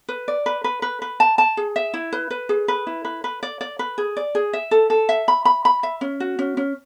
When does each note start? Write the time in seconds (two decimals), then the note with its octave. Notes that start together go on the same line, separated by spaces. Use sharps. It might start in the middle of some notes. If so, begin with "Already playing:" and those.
0.09 B4
0.28 D5
0.46 B4
0.64 B4
0.82 B4
1.02 B4
1.20 A5
1.38 A5
1.57 G#4
1.76 E5
1.94 E4
2.13 B4
2.30 B4
2.49 G#4
2.68 B4
2.87 E4
3.05 B4
3.24 B4
3.43 D5
3.61 D5
3.79 B4
3.98 G#4
4.17 D5
4.35 G#4
4.53 E5
4.71 A4
4.90 A4
5.09 E5
5.28 B5
5.45 B5
5.65 B5
5.83 E5
6.01 C#4
6.20 F#4
6.39 C#4
6.57 C#4